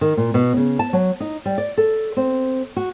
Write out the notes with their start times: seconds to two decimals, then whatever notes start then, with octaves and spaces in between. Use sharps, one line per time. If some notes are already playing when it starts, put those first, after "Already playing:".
0.01 D#3
0.17 A#2
0.34 B2
0.57 C#3
0.79 A5
0.93 F#3
1.20 D#4
1.46 G3
1.58 D5
1.77 A4
2.17 C4
2.76 F#4